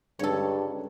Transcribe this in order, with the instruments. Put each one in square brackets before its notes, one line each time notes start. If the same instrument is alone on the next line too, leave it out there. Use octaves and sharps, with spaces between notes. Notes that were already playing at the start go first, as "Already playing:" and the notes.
[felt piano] C#2 D3 G3 [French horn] G2 [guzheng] A4 C#5